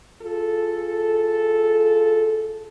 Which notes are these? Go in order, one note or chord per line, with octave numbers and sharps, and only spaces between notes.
F4 G#4 A4